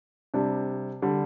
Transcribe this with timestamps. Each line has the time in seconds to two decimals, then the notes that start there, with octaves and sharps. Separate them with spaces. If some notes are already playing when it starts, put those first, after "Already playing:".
0.34 C3 G3 D4
1.02 D3 G3